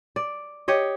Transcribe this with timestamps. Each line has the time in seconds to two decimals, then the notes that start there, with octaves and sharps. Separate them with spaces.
0.16 D5
0.68 G4 C#5 D#5